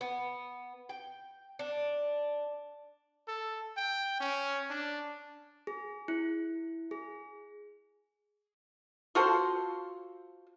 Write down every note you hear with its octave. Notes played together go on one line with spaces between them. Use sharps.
B3
G5
D4
A4
G5
C#4
D4
G#4
E4
G#4
F4 F#4 A4 C5